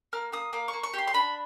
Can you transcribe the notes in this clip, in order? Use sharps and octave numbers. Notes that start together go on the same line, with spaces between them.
A#3 F6
A#3 D#6
A#3 D6
C#6
A#3
C#6
G4 C6
C6
D4 B5